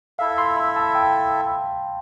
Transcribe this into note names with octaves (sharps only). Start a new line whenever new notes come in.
E4 A4 E5 F5
C6
B5
A5
G5